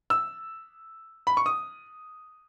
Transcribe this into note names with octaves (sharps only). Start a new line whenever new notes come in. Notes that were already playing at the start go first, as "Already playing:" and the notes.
E6
B5
C#6
D#6